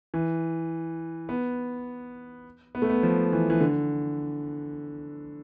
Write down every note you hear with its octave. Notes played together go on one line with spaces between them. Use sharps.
E3
B3
B3
A3
B3
F3
E3
E3
D3